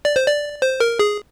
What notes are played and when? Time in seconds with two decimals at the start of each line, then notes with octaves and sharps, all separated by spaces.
0.05 D5
0.16 C5
0.27 D5
0.62 C5
0.80 A#4
0.99 G#4